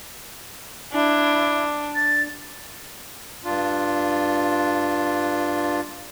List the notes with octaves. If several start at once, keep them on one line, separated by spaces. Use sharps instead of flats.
D4 E4
A6
G2 D4 F4